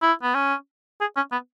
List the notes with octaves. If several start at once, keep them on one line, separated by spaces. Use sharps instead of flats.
E4
B3
C#4
G#4
C#4
B3